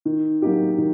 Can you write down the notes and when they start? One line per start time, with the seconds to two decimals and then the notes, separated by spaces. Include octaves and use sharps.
0.05 D#3
0.42 F#3 A#3 D#4 G4
0.78 D#3